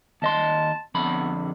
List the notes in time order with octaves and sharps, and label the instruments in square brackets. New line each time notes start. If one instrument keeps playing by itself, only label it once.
[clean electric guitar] D#2 D#5 C6 [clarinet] A5
[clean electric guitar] F2 D3 B5 [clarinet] B3